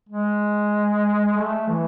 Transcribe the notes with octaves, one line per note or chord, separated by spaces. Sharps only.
G#3
A3
E3